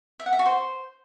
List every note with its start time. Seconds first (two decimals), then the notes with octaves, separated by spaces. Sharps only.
0.20 E5
0.26 F#5
0.33 E5
0.39 F#4
0.46 C5